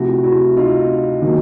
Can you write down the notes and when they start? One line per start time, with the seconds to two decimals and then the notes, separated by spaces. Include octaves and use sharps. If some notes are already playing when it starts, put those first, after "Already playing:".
Already playing: C3 F3 A3 E4 F#4
0.24 E4 F#4
0.56 D#4 F4
1.22 D#3 F#3 A#3